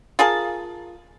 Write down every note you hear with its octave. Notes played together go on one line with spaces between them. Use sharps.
F4 G#4 A#4 A5